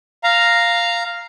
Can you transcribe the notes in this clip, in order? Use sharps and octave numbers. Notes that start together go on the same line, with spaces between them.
F5 A#5